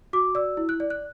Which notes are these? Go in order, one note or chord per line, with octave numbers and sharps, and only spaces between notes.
F#4 D6
D5 E6
E4
F#6
D5
F#6